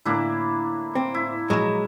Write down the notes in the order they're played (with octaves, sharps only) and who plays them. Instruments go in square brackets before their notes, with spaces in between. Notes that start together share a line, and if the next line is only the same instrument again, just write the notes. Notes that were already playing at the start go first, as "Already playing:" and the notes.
[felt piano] A2 D3 A3 [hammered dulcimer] A#3 D4 E4
[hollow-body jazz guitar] C4
[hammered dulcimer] E4
[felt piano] A#1 E6 E7 [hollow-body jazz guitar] F#3 G#3